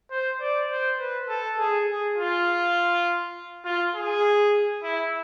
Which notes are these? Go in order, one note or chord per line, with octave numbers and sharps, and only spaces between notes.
C5
D5
C5
B4
A4
G#4
G#4
F4
F4
G#4
E4